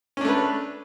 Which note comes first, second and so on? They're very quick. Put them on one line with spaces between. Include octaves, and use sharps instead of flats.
C#4 D4 A3 B4